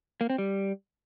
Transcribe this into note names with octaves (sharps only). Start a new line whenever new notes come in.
A#3
C4
G3